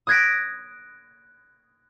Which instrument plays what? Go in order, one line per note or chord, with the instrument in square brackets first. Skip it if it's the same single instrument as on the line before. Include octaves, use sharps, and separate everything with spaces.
[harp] D#6 F#6 G#6 A#6 B6 D7